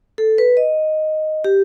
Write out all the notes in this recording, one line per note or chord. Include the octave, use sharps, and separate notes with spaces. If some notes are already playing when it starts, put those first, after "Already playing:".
A4
B4
D#5
G4